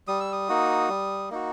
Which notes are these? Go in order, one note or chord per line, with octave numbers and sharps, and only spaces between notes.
G3 D#6
E6
D#6
A#3 D#4 F#4
G3
A#3 D#4 F#4